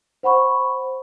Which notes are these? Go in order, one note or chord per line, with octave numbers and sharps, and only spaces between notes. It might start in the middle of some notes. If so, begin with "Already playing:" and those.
C5 F#5 B5 C#6